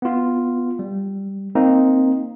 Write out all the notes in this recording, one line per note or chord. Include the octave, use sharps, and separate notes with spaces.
B3 F4
G3
A#3 C4 D#4